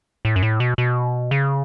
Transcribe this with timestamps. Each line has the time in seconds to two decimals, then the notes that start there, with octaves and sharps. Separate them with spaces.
0.25 A2
0.36 F#2
0.43 A2
0.60 B2
0.78 B2
1.31 C#3